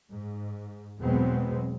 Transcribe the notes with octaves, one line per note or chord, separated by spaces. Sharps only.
G#2
E2 B2 F#3 G#3 B3 C4